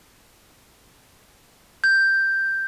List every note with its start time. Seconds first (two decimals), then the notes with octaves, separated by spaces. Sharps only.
1.84 G6